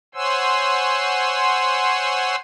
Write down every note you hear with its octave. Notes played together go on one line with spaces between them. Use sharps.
C5 C#5 F#5 G#5 C6 E6